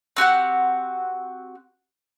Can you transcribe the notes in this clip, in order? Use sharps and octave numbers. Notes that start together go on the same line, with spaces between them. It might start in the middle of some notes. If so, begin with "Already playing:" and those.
C4 F#4 G4 F#5